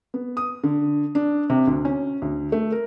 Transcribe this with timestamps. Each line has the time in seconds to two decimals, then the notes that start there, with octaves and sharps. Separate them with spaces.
0.14 B3
0.37 D#6
0.64 D3
1.15 D4
1.50 C3
1.67 D2
1.85 C#4
2.22 D2
2.52 A3
2.72 A#4